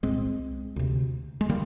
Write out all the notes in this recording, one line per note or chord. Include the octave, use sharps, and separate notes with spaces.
C2 A#2 G#3 C4
D2 C3
G#3
D3 G3 A#3